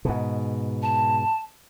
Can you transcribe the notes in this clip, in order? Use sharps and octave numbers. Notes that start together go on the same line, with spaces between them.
G#2 B2
A5